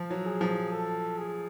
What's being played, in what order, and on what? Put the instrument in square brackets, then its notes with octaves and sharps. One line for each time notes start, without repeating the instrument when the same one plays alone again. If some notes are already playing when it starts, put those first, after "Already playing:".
Already playing: [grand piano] F3
F#3
[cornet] G#4
[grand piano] F3
[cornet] A4
G#4